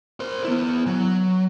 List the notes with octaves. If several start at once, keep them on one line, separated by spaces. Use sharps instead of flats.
A#4 C5
B3 E4
F#3